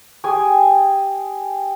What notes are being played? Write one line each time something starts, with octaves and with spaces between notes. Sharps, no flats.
G4 G#4 G#5 D#6